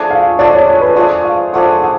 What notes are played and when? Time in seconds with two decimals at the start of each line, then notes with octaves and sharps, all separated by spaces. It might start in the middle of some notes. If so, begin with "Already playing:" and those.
Already playing: F3 A3 D4 G#4 D5
0.10 F5
0.39 F3 A3 D4 G#4 D5
0.53 C#5
0.67 C#5
0.81 B4
0.96 F3 A3 D4 G#4 D5
1.25 F5
1.53 F3 A3 D4 G#4 F#5
1.82 F#5